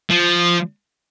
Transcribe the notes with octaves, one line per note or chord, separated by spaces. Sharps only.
F3